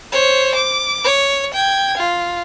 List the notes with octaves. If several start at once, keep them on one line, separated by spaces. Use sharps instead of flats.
C5 C#5
D6
C#5
G5 G#6
F4